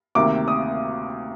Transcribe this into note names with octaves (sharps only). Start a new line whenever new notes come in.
D2 C3 D#3 A#3 D6
D#6